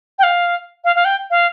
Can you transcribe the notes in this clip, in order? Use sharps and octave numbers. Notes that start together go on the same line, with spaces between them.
G5
F5
F5
F5
G5
F5